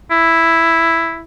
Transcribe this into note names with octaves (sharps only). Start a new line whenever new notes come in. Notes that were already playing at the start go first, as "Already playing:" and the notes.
E4